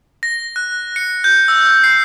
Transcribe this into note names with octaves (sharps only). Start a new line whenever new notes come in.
A#6
F#6
C#7
G6
E6
C7